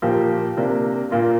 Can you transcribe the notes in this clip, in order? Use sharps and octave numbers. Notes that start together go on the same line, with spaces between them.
A#2 F3 A#3 G4
C3 A#3 D4
A#2 A#3 F4